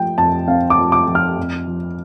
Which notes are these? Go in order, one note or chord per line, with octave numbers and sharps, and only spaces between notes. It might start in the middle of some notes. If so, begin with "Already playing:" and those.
Already playing: F3 A3 G5
F2 A5
C4 F5
D6
F3
D6
F3
F6
F2
F3